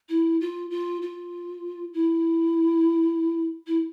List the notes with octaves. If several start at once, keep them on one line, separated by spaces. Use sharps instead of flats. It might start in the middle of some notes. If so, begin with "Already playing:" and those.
E4
F4
F4
F4
E4
E4